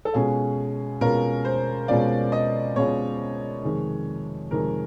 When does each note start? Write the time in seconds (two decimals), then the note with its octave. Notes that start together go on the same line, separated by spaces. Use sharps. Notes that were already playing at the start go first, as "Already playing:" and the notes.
0.05 A4
0.14 B2 G#3 C#4 F4 G#4
1.01 B2 G#3 C#4 F4 A#4
1.45 C5
1.88 B2 G#3 C#4 F4 D5
2.32 D#5
2.76 B2 G#3 C#4 F4 C#5
3.64 F2 C3 D#3 G#3
4.51 F2 C3 D#3 G#3 A#4